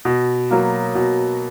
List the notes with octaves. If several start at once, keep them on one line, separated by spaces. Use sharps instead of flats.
B2
F#3 A#3
B2